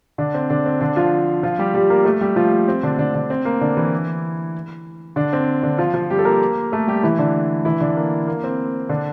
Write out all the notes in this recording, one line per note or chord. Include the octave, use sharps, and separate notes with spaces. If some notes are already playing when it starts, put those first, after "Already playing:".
D3 D4
C4
D3 D4
C4
D3 D4
F3 F4
F3 F4
G3 G4
G3 G4
A#3 A#4
A3 A4
G3 G4
F3 F4
C4
D3 D4
D3 D4
D3 D4
C4
A#3
D3 D4
E3 E4
D3 D4
C4
D3 D4
F3 F4
F3 F4
G3 G4
A4
A#3 A#4
A3 A4
G3 G4
E3 E4
D3 D4
E3 E4
D3 D4
A#3
A#3
C4
D3 D4